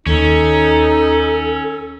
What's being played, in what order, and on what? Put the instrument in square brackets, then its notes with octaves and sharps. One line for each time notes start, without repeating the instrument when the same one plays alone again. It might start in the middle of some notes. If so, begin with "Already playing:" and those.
[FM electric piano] D#2 [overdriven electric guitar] C#4 [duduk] D#4 [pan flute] A4